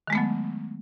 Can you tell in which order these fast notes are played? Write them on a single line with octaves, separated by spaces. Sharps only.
D#3 G#3 A3 B3 F#3